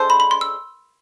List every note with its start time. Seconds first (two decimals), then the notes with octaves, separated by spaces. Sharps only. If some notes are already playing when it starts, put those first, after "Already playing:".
Already playing: G#3 D4 A4 C5
0.10 B5
0.20 B5
0.31 C6
0.41 E6